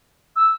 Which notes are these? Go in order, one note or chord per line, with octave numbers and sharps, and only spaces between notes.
E6